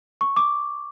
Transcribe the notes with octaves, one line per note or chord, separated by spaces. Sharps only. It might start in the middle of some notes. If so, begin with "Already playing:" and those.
C#6
D6